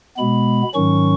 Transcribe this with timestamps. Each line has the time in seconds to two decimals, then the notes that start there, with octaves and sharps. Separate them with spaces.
0.17 B2 G#3 B3 B5
0.74 G#2 D#3 F#3 C#4 C#6